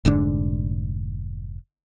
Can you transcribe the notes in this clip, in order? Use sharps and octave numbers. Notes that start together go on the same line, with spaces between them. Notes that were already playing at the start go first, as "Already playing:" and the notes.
F1 G#2 D3 D4